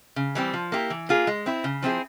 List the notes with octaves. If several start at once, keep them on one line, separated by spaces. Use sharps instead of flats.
C#3
E3 G3 C4
F3
A#3 E4 G4
E3
A#3 F4 G#4
G#3
C4 E4
C#3
F3 C4 E4 G#4